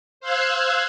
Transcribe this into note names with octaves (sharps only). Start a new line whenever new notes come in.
C5 F5 E6 F#6 G#6